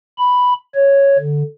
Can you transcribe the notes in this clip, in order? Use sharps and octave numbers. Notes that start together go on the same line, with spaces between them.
B5
C#5
D3